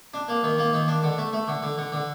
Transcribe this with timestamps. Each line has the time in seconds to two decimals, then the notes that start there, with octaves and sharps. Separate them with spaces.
0.14 D4
0.28 A#3
0.43 D#3
0.58 A#3
0.73 D#3
0.88 D4
1.03 D3
1.18 A3
1.33 A3
1.47 D3
1.63 D3
1.78 D3
1.92 D3